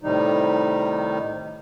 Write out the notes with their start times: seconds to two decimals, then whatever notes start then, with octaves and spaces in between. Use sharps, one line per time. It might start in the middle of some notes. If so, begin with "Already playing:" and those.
0.02 A2 C3 D#3 G3 D#4